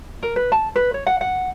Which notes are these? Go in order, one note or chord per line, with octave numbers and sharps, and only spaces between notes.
A#4
B4
A5
B4
C#5
F#5
F#5